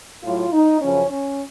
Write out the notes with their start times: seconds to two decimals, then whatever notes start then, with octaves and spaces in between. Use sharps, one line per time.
0.23 A2 F#3 F4
0.52 D#4
0.81 F#2 C#3 F3 C#4
1.10 C#4